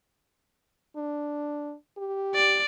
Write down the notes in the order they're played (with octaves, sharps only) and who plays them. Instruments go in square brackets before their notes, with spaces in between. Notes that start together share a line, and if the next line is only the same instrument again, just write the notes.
[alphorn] D4
G4
[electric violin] D5